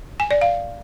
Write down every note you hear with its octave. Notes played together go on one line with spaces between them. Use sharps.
G#5
D5
F5